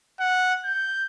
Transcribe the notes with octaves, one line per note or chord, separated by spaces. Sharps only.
F#5
G6